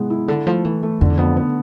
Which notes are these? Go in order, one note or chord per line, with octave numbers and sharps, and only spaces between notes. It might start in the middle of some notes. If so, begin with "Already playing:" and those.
Already playing: G#2 C3 G#3 B3 E4
E4
D3 A4
F3 A3
E3 A3
A3
F2 D3
E2
F2 B3
B3